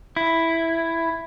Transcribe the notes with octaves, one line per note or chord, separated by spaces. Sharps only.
E4